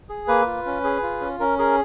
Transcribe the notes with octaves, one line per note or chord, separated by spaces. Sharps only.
G#4
A#3 B4
F4
C#4
G#4
F4
C#4
C#4 A#4
G#4 A#4